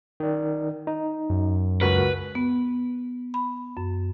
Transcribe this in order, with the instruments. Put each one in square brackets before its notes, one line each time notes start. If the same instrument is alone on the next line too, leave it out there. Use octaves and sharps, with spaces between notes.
[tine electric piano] D#3 D5
D#4
[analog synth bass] F#2
[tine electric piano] C#2 F#4 A#4 [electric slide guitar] B4
[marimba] B3
B5
F#2